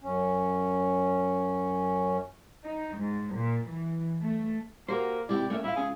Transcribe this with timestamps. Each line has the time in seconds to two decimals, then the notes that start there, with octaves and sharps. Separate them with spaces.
0.01 F#2 C#4
2.64 D#4
2.98 G#2
3.34 A#2
3.67 E3
4.22 A3
4.89 A#3 F#4 G4 A#4 C5
5.29 G#2 C3 E4 G4 D5 G5
5.50 A3 A#3 C#4 C#5 E5
5.64 E4 F4 E5 F5
5.76 C#2 C#4 G#4 G#5